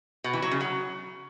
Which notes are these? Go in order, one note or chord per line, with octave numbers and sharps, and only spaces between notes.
B2
E3
F#3
C#3
F#3